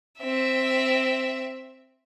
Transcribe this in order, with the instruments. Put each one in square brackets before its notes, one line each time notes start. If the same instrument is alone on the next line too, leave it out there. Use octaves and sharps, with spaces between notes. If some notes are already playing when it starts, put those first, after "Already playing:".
[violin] C4 E5